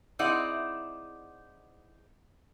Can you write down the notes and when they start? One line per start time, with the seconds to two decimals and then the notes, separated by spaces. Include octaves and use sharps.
0.19 C4 D#4 E4 G#4 D5 F#5